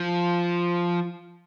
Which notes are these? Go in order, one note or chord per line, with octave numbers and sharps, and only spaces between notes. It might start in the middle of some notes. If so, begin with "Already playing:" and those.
Already playing: F3